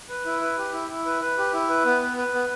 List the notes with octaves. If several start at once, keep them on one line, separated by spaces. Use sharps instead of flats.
B4
E4
B4
G4
E4
E4
B4
B4
G4
E4
B4
B3
B4
B4
B3